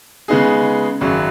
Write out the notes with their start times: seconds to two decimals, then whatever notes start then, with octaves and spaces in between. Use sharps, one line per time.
0.28 C#3 G#3 B3 D#4 G#4
1.01 G#1 F#2 C#3 F#3